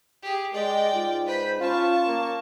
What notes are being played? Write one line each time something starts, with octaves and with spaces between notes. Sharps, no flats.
G4 G#4
G#3 D5 D#5 G5
G#2 F4
B4 C5 B5
C#4 F4 A5 C#6
A#3